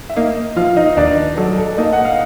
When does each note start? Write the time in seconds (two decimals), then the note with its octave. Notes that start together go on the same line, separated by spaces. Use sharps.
0.10 E5
0.16 A#3 D#4 D#5
0.56 F3 F4 F5
0.76 D#4 D#5
0.97 D#2 D4 D5
1.37 F#3 A4
1.58 A4
1.78 A#3 D#4 D#5
1.93 F#5
2.05 F5